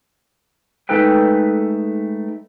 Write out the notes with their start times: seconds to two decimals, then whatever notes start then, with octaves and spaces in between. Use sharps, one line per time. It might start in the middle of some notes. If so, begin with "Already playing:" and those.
0.89 G#3 A3 D#4 A4 B4 G5